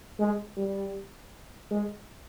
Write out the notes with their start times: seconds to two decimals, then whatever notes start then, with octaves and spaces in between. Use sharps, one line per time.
0.20 G#3
0.57 G3
1.71 G#3